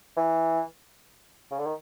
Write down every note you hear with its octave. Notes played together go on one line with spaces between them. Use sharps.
E3
C#3
D3
D#3